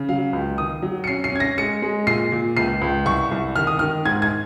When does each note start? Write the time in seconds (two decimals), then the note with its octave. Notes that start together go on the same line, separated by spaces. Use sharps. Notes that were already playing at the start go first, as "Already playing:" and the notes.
Already playing: C#3
0.09 F#3 F5
0.33 C#2
0.58 D#3 D#6
0.82 F#3
1.04 C#7
1.07 C#4 C7
1.24 C7
1.32 C#4 G#6
1.40 A#6
1.58 G#3 C#7
1.82 G#3
2.07 A#2 C7
2.32 A#2
2.57 C#2 C7
2.81 C#2
3.06 C2 C#6
3.31 C2
3.56 D#3 F6
3.67 D#6
3.79 D#3 F6
4.05 G#2 G#6
4.22 G#6